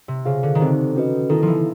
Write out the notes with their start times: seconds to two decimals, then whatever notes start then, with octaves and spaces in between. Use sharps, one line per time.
0.08 C3
0.25 C#3 F4 G#4 C5 F5
0.43 D3
0.55 D#3
0.60 D3 C4 D#4 G4 C5
0.95 C#4 F#4 B4 D#5
1.29 D#3 B3 E4 A4
1.43 F3
1.48 E3